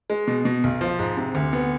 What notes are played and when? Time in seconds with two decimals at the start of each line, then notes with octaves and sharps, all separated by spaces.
0.10 G#3
0.28 B2
0.45 B2
0.64 B1
0.81 F3
0.99 G#2
1.17 C3
1.35 D2
1.53 B3